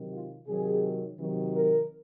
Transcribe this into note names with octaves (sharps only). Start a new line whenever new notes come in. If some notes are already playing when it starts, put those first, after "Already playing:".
Already playing: C3 D#3 F#3
F4
C3 D#3 F#3 G#4
C3 D#3 F#3
A#4